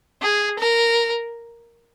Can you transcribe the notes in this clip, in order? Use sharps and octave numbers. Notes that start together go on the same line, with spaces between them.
G#4
A#4